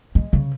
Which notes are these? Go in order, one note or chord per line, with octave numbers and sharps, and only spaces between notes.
G#3
C#3